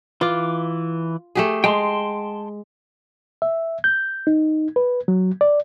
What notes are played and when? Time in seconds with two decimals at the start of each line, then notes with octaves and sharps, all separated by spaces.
0.21 E3 F4 B4 D6
1.35 A3 G4 G#4
1.64 G#3 G5 A5 C6
3.42 E5
3.84 G6
4.27 D#4
4.76 B4
5.08 F#3
5.41 D5